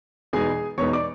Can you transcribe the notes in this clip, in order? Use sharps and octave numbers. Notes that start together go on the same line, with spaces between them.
E2 B2 G#3 B3 D#4 G#4 G#5
E2 B2 G#3 B3 D#4 C#5 C#6
D5 D6